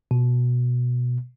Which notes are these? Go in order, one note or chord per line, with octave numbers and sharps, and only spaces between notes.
B2